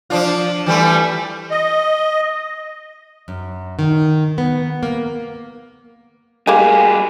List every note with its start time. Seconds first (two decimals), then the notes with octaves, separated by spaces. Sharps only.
0.10 F3 D4 F4
0.66 E3 G3 A3
1.51 D#5
3.28 F#2
3.79 D#3
4.38 B3
4.83 A#3
6.47 G3 A#3 G4 G#4 G#5